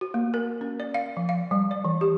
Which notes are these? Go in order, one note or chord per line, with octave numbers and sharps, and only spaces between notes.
F#4
A#3
A#4
C#4
D5
F5
F3
F5
G3
D5
E3
G4